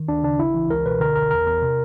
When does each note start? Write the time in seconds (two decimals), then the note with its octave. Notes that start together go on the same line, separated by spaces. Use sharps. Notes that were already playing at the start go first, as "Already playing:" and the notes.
Already playing: D#3
0.08 D2 D4
0.23 C#3 D4
0.39 A1 E4
0.54 E3
0.69 C#2 A#4
0.85 B2 B4
1.00 D3 A#4
1.15 G#1 A#4
1.31 E2 A#4
1.46 E2 A#4
1.62 C3